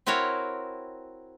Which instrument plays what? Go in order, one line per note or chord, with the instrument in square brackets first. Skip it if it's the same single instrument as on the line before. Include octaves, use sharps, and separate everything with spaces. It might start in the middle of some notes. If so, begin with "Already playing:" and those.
[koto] C4 E4 F#4 A#4 C#5